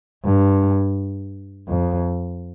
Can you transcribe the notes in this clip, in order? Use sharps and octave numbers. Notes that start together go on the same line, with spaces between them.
G2
F2